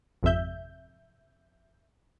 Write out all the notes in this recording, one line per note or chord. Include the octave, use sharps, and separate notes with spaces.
G#1 F2 C3 E5 G6